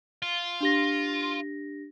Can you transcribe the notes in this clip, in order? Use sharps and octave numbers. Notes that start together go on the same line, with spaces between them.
F4
D4 G4 A#6